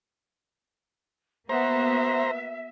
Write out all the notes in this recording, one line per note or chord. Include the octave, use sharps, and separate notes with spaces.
A#3 B3 F#4 C5 E5 A#5